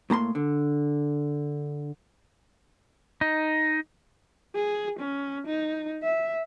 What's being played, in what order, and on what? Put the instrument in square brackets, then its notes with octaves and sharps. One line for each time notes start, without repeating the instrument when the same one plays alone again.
[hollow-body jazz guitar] A2 A#3 A#5 C6
D3
[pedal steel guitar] D#4
[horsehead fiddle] G#4
C#4
D#4
E5